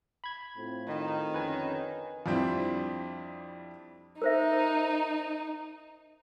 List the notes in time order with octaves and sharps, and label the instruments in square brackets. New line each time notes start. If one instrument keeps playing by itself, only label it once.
[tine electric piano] B5 G#6
[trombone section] A2 C4 F4
[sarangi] D#3
[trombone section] F2 D3 C#4 [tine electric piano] B4 G#5
[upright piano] F2 G3 C4 D4 E4
[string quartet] D#4 [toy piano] A#4 C5 E5